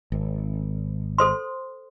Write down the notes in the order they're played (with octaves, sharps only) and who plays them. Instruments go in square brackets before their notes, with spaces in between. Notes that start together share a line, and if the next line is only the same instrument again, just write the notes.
[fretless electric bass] G#1
[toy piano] A4 C5 C6